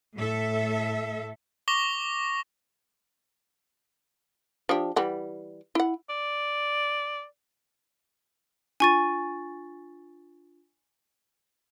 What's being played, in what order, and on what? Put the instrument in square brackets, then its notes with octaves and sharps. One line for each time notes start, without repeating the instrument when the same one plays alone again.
[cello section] A2 A4 E5
[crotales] C#6 D6 A#6 G7
[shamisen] F3 D4 G4
E3 G3 F#5
E4 F#5
[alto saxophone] D5
[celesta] D4 F4 A6 [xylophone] G#5 C#6 D#7